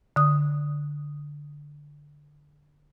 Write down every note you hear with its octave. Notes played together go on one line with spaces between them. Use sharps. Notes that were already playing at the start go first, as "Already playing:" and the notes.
D3 D#6